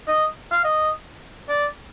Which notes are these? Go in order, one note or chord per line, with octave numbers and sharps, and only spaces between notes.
D#5
F5
D#5
D5